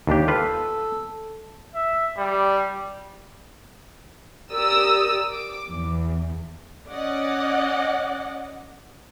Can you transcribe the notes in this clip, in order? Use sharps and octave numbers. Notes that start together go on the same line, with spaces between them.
D#2 D4 G4
F4 A4 B4
E5
G3
G4 A#4 D5 D#6 E6
D6
E2
C#4 D5 D#5 F#5